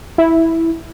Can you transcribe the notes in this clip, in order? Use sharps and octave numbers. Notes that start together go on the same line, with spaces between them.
E4